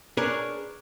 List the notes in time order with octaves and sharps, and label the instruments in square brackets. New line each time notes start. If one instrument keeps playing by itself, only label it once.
[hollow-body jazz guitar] D4 G#4 A#4 B4 C#5